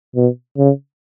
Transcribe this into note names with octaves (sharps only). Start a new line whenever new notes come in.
B2
C#3